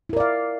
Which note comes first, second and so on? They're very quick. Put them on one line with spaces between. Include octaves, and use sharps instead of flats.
E4 A#4 D5 F5